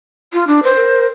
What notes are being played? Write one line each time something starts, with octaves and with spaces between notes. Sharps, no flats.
F4
D4
B4 C5
A#4